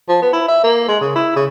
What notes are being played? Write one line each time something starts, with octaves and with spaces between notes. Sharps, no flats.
F3
B3
E4
E5
A#3
G#3
C#3
E4
C#3